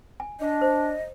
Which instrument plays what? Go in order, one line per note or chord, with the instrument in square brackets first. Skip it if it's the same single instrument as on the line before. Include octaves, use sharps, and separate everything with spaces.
[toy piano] G#5
[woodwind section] D4 [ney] D#5
[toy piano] C5